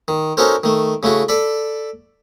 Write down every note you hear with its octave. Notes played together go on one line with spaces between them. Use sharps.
D#3
C#4 D#4 F#4 A4 A#4 C5
D#3 A3
C#3 A3 E4 F#4
A4 D5 B5